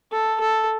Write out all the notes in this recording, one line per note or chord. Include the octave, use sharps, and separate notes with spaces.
A4
A4